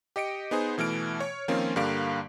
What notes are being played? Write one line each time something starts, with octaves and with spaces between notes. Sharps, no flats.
G4 D#5 C#7 D7
B3 D#4 G#4 C5
B2 E3 A3 F6 D7
C#5
D#3 F3 A#3 C4 C#4 F4
G2 D3 G3 A#3 F5 D7